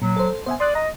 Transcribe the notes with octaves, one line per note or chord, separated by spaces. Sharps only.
A#2 F#3
A4 C5
B3 C5 E5 G#5
D5 C6 D#6 F#6
D#5 A#5